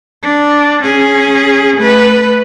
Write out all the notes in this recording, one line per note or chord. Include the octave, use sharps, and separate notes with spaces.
D4
C#4 G#4
A3 B4